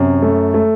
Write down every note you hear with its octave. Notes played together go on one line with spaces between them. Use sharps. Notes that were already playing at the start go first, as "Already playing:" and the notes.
Already playing: F#2 C3
A3
A3